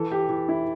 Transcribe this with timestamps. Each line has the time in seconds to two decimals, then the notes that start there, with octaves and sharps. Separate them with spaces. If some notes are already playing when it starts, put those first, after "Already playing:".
Already playing: E3 A4
0.12 G4
0.29 E3
0.49 E4